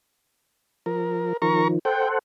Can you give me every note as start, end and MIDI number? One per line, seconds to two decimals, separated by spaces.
0.86 1.33 53
0.86 1.37 70
1.42 1.79 51
1.42 1.79 53
1.42 1.68 70
1.42 1.68 82
1.42 1.68 85
1.85 2.19 69
1.85 2.19 72
1.85 2.19 78
1.85 2.08 79